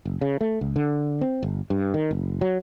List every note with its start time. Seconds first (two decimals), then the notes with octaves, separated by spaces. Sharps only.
0.05 F#1
0.21 C#3
0.41 A3
0.61 C#2
0.76 D3
1.21 C4
1.43 G1
1.70 G2
1.94 D#3
2.11 F#1
2.41 F#3